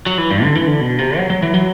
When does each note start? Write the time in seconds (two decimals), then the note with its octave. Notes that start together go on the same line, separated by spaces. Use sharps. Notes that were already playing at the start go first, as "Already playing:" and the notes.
0.06 F#3
0.18 E3
0.30 G2
0.43 D3
0.55 E3
0.67 D3
0.81 B2
0.99 C3
1.17 F#3
1.30 F#3
1.43 E3
1.54 F#3